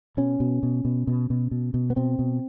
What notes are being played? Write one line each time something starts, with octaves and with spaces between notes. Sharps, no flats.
B2 C#4
B2
B2
B2
B2
B2
B2
B2
B3
B2 C4
B2